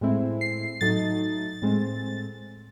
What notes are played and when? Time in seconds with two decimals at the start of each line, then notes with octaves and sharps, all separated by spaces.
0.01 A2 G#3 C4 E4
0.41 C7
0.81 A2 F#3 A3 D#4 A6
1.62 A2 G#3 C4